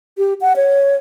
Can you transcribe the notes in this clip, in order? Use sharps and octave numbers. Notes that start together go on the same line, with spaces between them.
G4
F#5
C#5